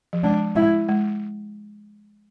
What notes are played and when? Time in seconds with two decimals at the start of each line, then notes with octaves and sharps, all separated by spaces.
0.13 F3
0.23 G#3 D4
0.56 G#3 E4
0.88 G#3